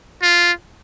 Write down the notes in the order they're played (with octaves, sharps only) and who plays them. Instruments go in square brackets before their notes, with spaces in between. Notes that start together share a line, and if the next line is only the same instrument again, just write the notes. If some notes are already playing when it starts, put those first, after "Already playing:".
[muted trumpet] F4